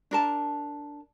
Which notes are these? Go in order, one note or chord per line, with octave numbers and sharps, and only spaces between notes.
D4 A#4 A5